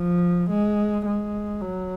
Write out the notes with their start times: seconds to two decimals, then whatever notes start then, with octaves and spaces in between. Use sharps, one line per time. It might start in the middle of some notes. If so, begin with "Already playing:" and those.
Already playing: F3
0.50 G#3
1.05 G#3
1.61 F#3